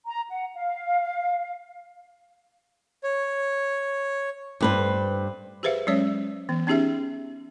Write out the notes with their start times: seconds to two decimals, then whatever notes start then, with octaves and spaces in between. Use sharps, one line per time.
0.06 A#5
0.30 F#5
0.54 F5
3.03 C#5
4.61 G2 B4 C5
5.63 G4 G#4 B4 C5 E5 F5
5.87 F#3 G#3 C#4 C#5 D5
6.49 E3 B3
6.67 B3 C#4 D#4 G4 G#4 E5